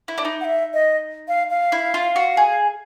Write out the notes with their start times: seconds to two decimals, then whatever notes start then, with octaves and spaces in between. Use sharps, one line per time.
0.08 E4
0.18 D4
0.25 D#4
0.41 F#5
0.44 E5
0.74 D#5
1.28 F5
1.50 F5
1.72 E4
1.94 F4
2.16 F#4
2.37 G#4